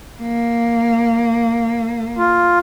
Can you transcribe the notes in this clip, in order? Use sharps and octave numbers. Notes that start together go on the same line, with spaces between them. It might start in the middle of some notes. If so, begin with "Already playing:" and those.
A#3
F4